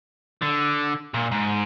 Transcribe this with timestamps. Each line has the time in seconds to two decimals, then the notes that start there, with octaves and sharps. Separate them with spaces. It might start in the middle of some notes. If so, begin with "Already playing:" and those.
0.42 D3
1.14 A#2
1.32 G#2